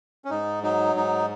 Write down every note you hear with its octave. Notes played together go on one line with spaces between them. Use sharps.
C#4
G#2 D#4
F#3 D#4
G#2 D#4